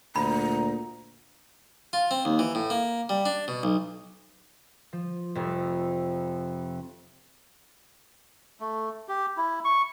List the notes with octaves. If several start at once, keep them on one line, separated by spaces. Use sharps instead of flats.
D2 A#2 A#5 B5
F4
C4
D#2
E3
A2
A#3
G3
D4
B2
B1
F3
F1 F2
A3
G4
E4
C#6